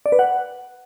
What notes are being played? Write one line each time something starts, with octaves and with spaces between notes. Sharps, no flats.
D5
B4
F#5